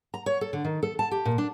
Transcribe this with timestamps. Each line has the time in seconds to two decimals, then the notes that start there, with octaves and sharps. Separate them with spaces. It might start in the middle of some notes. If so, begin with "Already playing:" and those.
0.14 A#5
0.26 C#5
0.41 A4
0.53 D3
0.65 D#3
0.83 A4
0.99 A5
1.11 G4
1.25 A#2
1.38 D4